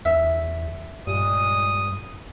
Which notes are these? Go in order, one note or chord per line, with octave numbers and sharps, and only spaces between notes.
E2 E5
G2 A#2 G#3 D#6